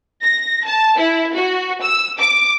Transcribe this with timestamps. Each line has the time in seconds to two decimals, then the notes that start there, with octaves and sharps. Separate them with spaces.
0.22 A#6
0.66 A5
0.97 E4
1.35 F#4
1.82 E6
2.19 D6